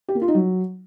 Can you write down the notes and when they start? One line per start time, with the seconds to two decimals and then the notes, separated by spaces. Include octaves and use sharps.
0.08 G4
0.15 A#3
0.22 F4
0.28 D#4
0.35 F#3